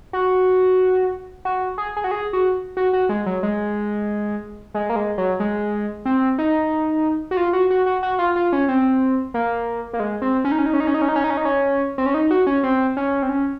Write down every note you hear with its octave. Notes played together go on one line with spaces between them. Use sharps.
F#4
F#4
G#4
G#4
F#4
G#4
F#4
F#4
F#4
G#3
F#3
G#3
G#3
A#3
G#3
F#3
G#3
C4
D#4
F#4
F4
F#4
F#4
F#4
F#4
F4
F4
C#4
C4
A#3
A#3
G#3
C4
C#4
D#4
C#4
D#4
C#4
D#4
C#4
D#4
C#4
D#4
C#4
D#4
C#4
D#4
C#4
C4
C#4
D#4
F#4
C#4
C4
C#4
C4
C#4